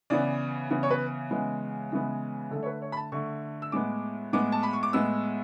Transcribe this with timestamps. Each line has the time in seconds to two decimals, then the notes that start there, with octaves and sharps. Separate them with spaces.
0.10 C#3 E3 B3 D5
0.70 C#3 E3 B3
0.83 C#5
0.91 B4
1.31 C#3 E3 G#3 B3
1.92 C#3 E3 G#3 B3
2.51 D3 A3 A4
2.63 C#5
2.66 B4
2.82 C#5
2.92 B5
2.97 A5
3.12 D3 A3 C#6
3.62 E6
3.72 A2 G#3 B3 D6
4.33 A2 G#3 B3 D6
4.52 A5
4.63 B5
4.73 C#6
4.83 D6
4.93 A2 G#3 B3 E6